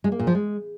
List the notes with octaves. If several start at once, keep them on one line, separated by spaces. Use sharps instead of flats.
G#3
A#3
A#2
F3
G#3